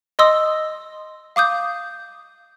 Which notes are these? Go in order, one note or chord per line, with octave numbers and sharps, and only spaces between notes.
D#5 C6 D#6 E6 A#6
F5 D6 D#6 G6